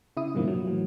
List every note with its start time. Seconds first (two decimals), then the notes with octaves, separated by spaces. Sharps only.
0.17 C#3 E4 D#6
0.35 G2 B2 D#3 F3 F#3 A#3
0.48 A#2 F#3
0.67 A2 E3 F#3